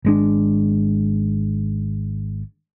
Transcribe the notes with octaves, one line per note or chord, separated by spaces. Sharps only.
G#1 G#3 D4